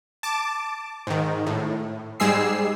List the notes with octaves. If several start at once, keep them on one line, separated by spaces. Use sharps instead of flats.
A5 D6
G#2 D#3
A2
G#2 G3 G#3 G#4 E6 C7